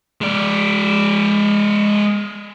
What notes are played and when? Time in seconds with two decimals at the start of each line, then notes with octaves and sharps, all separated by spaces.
0.21 G#3 D5